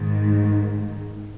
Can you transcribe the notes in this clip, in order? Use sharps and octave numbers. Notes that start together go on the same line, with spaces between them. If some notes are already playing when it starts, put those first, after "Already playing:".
Already playing: G#2 D#3